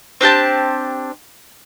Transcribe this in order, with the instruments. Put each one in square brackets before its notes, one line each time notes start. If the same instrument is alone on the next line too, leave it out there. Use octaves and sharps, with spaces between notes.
[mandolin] C4 D4 G4 A5